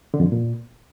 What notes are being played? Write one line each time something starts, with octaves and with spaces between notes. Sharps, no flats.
D3
F2
G2
A#2